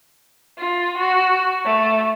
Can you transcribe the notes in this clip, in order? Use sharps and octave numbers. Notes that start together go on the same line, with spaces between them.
F4
F#4
A3